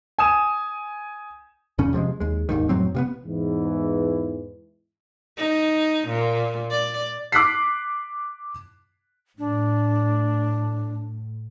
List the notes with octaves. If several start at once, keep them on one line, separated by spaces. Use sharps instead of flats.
G#5 D#6 E7
E2 A#2 C#3 C#4
C3 F3 G3 G#3
D#2 G#3
G1 D#2 G#2 D#3
F2 A2 F#3 C4
C3 A#3 B3
E2 G#2 E3
D#4
A#2
D5
D6 F#6 B6 C7
A2 D4